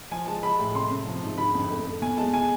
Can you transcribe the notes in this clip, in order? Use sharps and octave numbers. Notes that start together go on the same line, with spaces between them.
F3 G#5
G#3 A5
G#3 B5
A2
C3 C6
C3
F3
G#2
D3 B5
F2
A3
A3
B2 G#5
G#3 A5
G#5